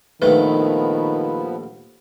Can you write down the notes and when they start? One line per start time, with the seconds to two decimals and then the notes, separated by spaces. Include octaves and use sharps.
0.22 A#1 D#2 D#3 F3 A3 B3 B4